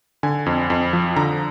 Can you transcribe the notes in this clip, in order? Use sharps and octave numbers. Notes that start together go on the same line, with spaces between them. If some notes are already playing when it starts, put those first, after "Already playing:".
D3 G#5
F2
F2
F3
D3 A#5